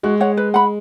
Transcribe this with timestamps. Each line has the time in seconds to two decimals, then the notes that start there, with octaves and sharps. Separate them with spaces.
0.03 G#3 F#4
0.21 C#5 F#5
0.37 B4
0.54 F#5 B5